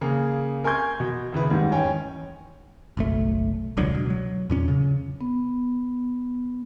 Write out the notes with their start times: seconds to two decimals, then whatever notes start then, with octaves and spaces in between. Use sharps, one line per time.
0.01 C#3 A#3 G#4
0.64 A#4 G#5 C6 C#6 G6 G#6
1.00 B2
1.33 D#2 C#3 E4 B4
1.49 G#2 D#3 G3
1.71 E2 C#4 G5 G#5
2.97 F#1 B1 A3
3.77 E1 C#2 D3 F#3
3.95 B2
4.10 F#3
4.50 E2 A#2 C#4
4.68 C#3
5.21 B3